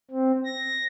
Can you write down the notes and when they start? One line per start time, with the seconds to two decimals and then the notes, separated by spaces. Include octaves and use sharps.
0.11 C4
0.45 A#6